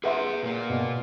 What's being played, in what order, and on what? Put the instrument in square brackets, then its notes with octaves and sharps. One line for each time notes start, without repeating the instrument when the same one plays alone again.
[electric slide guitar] G#4 F#5 [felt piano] B4 E5 C6
[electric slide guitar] A#2 A#3
[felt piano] B2